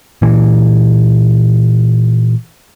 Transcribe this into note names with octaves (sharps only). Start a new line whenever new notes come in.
A#2 E3